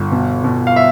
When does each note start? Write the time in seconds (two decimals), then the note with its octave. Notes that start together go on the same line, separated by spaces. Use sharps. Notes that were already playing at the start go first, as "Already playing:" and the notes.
Already playing: G1
0.12 B2
0.44 B2
0.67 F5
0.76 E5